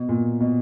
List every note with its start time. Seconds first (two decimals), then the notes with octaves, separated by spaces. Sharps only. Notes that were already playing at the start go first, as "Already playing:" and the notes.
Already playing: B2
0.09 A#2
0.40 B2